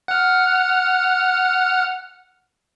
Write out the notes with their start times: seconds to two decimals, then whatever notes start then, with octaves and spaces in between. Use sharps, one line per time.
0.08 F#5 F6